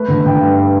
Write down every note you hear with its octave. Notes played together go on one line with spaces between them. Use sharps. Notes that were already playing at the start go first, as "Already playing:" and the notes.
Already playing: A3 B4
D3
D3 G5
G2